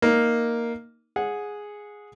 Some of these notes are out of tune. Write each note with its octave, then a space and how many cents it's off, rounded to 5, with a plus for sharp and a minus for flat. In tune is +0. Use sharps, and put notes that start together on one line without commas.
A#3 +0 D#4 +0
G#4 +0 F#5 -20